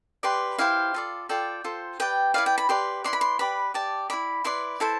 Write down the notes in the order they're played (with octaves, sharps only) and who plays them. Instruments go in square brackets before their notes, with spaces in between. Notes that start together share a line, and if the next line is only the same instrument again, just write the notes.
[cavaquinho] G4 B4 D5 C6
E4 G4 C5 F5
F4 A4 D5
F4 A4 D5 G5
F4 A4 C5
G4 B4 D5 G5
E4 B4 D5 F5
G5
B5
G4 B4 D5 C6
E4 B4 D5 C6
B5
C6
G4 B4 D5 B5
G4 D5 A5
E4 A4 D5 B5
E4 B4 D5 C6
E4 A4 C5 A5